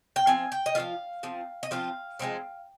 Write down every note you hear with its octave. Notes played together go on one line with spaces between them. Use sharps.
G5
F3 C4 F4 G#5
G5
D#5
F3 C4 F4 F5
F3 C4 F4
D#5
F3 C4 F4 F5
F3 G#3 C4 D#4